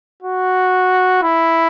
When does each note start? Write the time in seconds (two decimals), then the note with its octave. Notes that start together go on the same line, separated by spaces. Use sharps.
0.23 F#4
1.23 E4